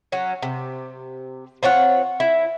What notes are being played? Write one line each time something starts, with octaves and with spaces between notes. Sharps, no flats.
F#3 C#4
C3
C4 F4 C#5 F#5
E4